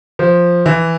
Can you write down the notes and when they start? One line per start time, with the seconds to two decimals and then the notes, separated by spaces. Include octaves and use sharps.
0.19 F3
0.66 E3